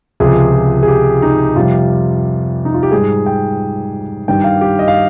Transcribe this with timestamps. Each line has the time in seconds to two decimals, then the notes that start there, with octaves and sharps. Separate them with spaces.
0.20 C#2 C3 F3 G#4
0.83 G#4
0.88 G4
1.22 D#4
1.55 F2 C3 G3 F4
2.65 D#4
2.74 F4
2.83 G4
2.91 G#2 G3 G#4
3.26 G5
4.28 G2 D#3 G3 G5
4.44 F5
4.61 G4
4.79 D#5
4.88 F5